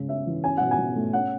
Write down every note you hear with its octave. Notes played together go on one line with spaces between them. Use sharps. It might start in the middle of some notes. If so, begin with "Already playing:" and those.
Already playing: C#3 G#3
C#4 E5
E3
C#4 G#5
B2 F#5
G#5
B2
A3
C#4 F#5